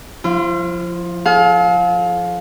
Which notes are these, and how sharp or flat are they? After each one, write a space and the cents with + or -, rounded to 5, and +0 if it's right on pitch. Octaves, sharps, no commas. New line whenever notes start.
F3 +15 F4 -45
A4 -45 F5 +25